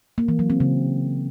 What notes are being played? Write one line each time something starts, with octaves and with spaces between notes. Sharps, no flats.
A#3
E3
F#3
C4
C#3